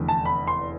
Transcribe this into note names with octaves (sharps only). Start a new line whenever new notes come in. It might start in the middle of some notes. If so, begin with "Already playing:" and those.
Already playing: F1 E2 D3
A5
B5
C6